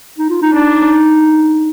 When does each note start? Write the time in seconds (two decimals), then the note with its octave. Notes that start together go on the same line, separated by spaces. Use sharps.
0.18 D#4
0.30 F4
0.42 D#4
0.53 D4 D#4